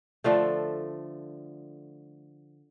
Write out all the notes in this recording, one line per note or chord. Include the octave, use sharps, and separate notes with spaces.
D3 F3 A3